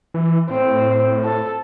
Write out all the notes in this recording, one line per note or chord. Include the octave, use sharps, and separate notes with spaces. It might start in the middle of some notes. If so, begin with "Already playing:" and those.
E3
A2 C4
A4